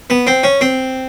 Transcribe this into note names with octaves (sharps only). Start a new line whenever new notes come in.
B3
C4
C#4
C4